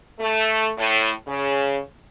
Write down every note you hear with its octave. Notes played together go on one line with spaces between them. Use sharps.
A3
A2
C#3